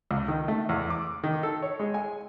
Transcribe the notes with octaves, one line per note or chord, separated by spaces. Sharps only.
C#2
D#3
A3
E2
D6
D#3
A4
C#5
G#3
G#5